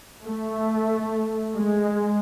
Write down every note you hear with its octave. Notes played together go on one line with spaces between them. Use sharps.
A3
G#3